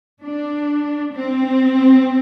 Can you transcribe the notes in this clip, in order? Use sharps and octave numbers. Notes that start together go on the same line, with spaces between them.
D4
C4